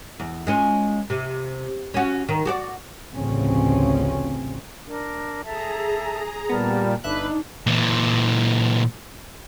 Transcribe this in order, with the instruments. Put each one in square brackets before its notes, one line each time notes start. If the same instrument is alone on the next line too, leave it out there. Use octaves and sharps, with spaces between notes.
[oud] E2
G#3 C#4 F4
C3
C#4 F#4
D#3
F#4 G4 D5
[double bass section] A1 D2 C#3 F3 C4 C#4
[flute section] D4 A#4
[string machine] G#4 A#5 [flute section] A4 E5 A5
[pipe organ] A#2 G3 [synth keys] B3 [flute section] A#4 D5 A5
[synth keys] G1 E5 F#6 [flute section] D4 [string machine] D#4 [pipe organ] B4
[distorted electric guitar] A#2 E3